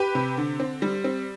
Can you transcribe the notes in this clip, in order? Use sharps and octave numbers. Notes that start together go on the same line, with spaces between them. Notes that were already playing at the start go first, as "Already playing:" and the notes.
Already playing: G4 B4
C3
D3
C4
G3
C4